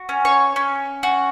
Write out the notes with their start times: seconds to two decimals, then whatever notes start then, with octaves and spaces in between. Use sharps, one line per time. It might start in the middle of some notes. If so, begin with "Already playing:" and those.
Already playing: F#4
0.09 C#4
0.25 C#5 C#6
0.56 C#4
1.03 F#4